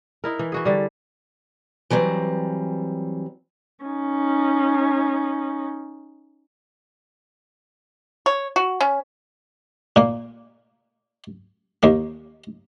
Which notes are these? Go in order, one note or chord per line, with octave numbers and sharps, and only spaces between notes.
D#4 E4 A#4
E3
E3 F#4 G#4
D3 G3
E3 F#3 G3 C4
C#4 D#4
C#5
F#4
C#4
A#2 A#3
D#2 A#3